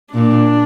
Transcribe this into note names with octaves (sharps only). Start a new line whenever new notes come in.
A#2 D4